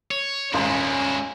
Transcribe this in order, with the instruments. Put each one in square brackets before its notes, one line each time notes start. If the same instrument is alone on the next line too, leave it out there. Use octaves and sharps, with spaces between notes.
[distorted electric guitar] C#5
[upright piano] D#1 G#1 C6 [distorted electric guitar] G#3 E4 [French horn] C#4